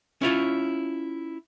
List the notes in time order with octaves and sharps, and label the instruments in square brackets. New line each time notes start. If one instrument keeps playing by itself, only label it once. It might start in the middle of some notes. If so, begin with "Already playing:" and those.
[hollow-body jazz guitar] C#4 E4 F4 C#5